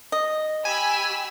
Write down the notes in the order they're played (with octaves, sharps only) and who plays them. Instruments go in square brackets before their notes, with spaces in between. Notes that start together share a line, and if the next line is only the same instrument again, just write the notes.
[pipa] D#5
[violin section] G4 B5 E6 [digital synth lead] G#5